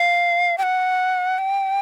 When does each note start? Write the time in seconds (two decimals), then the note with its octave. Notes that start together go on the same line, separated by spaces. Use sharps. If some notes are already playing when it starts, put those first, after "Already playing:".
Already playing: F5
0.58 G5
0.63 F#5
1.38 G5